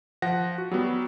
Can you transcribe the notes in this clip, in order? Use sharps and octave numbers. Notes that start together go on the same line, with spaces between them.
F3 F#5 A#6
F#4
F#3 G3 B3